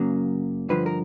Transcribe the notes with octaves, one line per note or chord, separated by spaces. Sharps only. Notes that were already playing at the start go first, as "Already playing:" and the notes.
Already playing: F#2 C#3 F#3 A#3
G2 D3 F3 B4
A#4